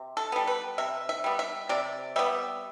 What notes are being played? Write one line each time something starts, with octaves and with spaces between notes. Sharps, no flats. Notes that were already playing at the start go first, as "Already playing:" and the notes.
Already playing: C3
A4
G3 B3
B4
C3 E5
E5
G3 B3
E5
C3 D5
G3 B3 E5